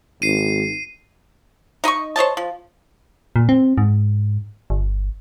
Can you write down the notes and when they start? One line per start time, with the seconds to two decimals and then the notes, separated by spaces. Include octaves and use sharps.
0.22 G#1 C7 D#7
1.84 D#4 D#5 B5 C#6
2.16 C5 C#5 D#5 A5
2.37 F3
3.36 A#2
3.49 C4
3.78 G#2
4.70 G1